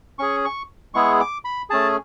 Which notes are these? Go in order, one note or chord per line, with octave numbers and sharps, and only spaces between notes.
C#4 G#4 C#6
C#6
G#3 B3 E4 G#4 C#6
D6
B5
A3 C#4 G#4 A5